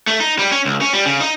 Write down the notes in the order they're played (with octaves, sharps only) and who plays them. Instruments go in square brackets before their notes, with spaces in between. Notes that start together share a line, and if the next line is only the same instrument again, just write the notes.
[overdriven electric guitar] A3
D#4
G3
C#4
C#2
C#4
G3
C#3
D#4